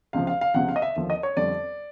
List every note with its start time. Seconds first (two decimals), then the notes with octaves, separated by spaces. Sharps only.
0.13 C#2 C3 F3 F5
0.27 F5
0.41 F5
0.54 C#2 C3 F3 F#5
0.69 F5
0.76 D#5
0.82 E5
0.96 D#2 D3 F3
1.10 D#5
1.23 C#5
1.37 F2 D3 G3 D5